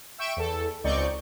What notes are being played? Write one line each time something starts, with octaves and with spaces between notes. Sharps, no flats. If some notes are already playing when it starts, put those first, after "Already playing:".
E5 G5 C#6 D7 E7
E2 A4
C#2 C4 D#4 D5 C#6 G6